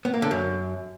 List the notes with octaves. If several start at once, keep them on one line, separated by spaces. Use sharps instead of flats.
B3
A#3
D3
F#2